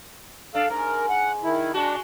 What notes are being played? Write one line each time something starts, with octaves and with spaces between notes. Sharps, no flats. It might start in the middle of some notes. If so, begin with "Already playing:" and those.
D4 A4 F5
G#2 A#4
F#5
D#3 E4
G#3 D4 F#4